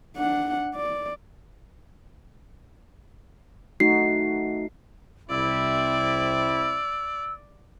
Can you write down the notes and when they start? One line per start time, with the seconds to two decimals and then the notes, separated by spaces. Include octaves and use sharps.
0.17 D4 F#5
0.75 D5
3.80 A3 D#4 F#4 C7
5.30 C2 C4 E4 D5 E6